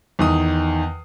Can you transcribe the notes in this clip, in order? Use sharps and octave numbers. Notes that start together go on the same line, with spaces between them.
E2 D#3 D#6